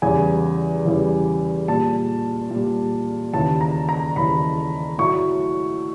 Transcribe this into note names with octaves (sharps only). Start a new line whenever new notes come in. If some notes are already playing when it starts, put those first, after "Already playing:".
E2 C#3 E3 G3 G#5
E2 C#3 E3 G3
A#2 G3 A5
A#2 G3
D#2 C#3 E3 A5
A#5
A#5
D#2 C#3 E3 B5
A2 F#3 A3 C#6